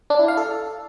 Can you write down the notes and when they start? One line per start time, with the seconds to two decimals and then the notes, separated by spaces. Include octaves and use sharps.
0.10 D4
0.19 E4
0.28 F5
0.37 A4